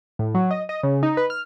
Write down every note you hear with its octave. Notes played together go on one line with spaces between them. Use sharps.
A2
F#3
D#5
D#5
C#3
D#4
B4
F6